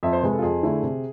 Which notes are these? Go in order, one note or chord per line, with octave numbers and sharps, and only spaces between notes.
F2 E5
C5
C3 G#3 B4
A4
F4
F2 G#4
D3 A3 E4
C3